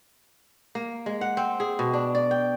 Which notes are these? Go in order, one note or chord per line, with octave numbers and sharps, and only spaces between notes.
A#3
G#3
F#5
C4
G#4
B2
D4
D5
G5